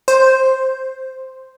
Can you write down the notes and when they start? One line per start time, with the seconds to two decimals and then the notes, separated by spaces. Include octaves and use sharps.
0.08 C5